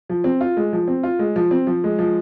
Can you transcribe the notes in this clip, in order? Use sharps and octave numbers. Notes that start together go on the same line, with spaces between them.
F3
C4
F4
G#3
F3
C4
F4
G#3
F3
C4
F3
G#3
F3